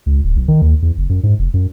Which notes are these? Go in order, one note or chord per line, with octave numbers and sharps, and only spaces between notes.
C#2
D1
B1
D#3
D#2
E2
F#1
F#2
G#2
F1
F#2